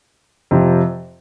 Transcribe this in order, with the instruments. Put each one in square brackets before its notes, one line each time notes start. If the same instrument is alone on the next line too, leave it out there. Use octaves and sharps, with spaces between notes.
[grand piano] F2 C3 F3